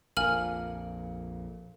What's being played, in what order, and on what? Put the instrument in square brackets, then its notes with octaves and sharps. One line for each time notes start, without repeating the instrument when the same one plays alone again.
[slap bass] A#1 F2 A#2 [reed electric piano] A#4 F5 [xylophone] G#5 F6 F#7